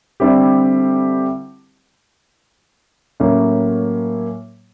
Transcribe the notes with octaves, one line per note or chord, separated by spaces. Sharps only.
D3 G3 C4 E4 G4
A2 F#3 A#3 C#4